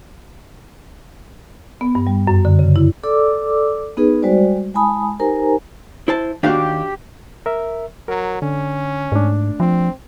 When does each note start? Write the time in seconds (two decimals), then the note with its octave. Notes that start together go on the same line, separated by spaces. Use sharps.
1.81 B3
1.95 G2
2.07 G3
2.27 F#2
2.45 D3
2.59 C#3
2.76 E4
3.04 A4 D5 D6 E6
3.97 B3 D#4 G#4 B4
4.22 G3 G#3 F#4 C5 D5
4.74 G#3 E4 G#5 A5 B5 D#6
5.19 D#4 G4 A#4 C5 G#5 A#5
6.08 E4 C5 A5
6.43 D#2 D4 F#4 G4 F5
7.46 A#4 E5
8.08 F#3 A#4
8.42 D3 C#4
9.12 G#2 A3 D4
9.60 F3 C4